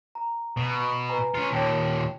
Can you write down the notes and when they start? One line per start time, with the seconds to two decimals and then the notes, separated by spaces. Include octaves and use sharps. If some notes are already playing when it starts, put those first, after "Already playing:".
0.15 A#5
0.57 B2
1.09 B4 G#5 A#5
1.35 C#4 F4
1.53 D#2 A#2 C#5 G5 A5